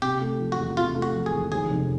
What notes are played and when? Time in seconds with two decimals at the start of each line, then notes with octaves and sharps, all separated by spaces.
0.02 C3 G4
0.21 A3
0.39 F3
0.52 F#4
0.58 E2
0.77 C3 F4
0.96 A3
1.02 F#4
1.14 F3
1.26 G#4
1.33 E2
1.51 D#2 G#4
1.70 F1